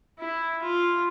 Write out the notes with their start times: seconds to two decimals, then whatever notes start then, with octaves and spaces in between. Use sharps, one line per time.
0.19 E4
0.62 F4